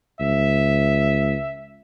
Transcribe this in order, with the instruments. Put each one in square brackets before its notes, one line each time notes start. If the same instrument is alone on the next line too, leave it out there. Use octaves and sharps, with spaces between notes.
[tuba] C#2 [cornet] E5